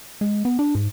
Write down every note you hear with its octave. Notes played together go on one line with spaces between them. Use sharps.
G#3
B3
D4
G#2